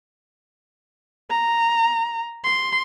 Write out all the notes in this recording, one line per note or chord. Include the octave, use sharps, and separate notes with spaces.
A#5
C6